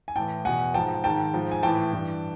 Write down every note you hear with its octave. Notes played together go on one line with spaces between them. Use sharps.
G#5
A2 E3 G5 A5
E2 B2 F#5 G#5
G#2 F3 G5 A5
G#2 D#3 G5 A5
G#2 F3
G#5
A2 E3 G5 A5
G2 E3